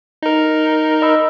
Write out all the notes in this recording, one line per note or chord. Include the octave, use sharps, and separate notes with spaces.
D#4 A#4
D#5 B5 E6